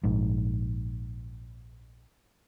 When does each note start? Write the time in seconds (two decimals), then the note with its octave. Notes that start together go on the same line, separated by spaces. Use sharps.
0.04 A#1 G#2